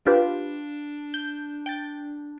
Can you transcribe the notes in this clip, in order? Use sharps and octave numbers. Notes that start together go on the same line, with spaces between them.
D4 F4 G4 B4
G6
G5 G6 A6